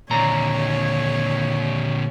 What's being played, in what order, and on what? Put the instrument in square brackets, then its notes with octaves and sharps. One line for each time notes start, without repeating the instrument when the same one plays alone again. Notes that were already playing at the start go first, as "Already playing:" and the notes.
[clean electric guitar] D#2 A#5 [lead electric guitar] A#2 D3 [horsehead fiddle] C#5